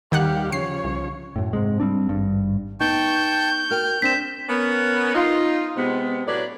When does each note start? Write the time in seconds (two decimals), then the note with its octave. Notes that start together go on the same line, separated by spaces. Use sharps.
0.12 D#2 D#3 G3 G4 F5 F#5 F#6
0.52 C#3 F3 C#5 C7
0.84 C2
1.36 F#2 A2
1.53 G#2 C3 G#3
1.80 G3 C4 D4
2.08 G#1 G2
2.80 B3 D#4 G5 A5 C#6 G6
3.70 F#4 A#4 G5 F6
4.02 C4 D4 B6 E7
4.49 B3 C#4 A#4
5.15 D#4 F4
5.77 C3 G#3 B3
6.27 A2 F#3 A3 D4 B4 D5